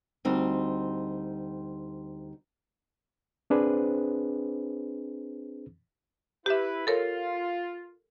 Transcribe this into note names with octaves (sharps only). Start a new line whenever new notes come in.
D2 G3 C4 D#4
C4 D4 G#4 B4 C5
E4 G4 B4 E5
F4 A4 A#4 C#5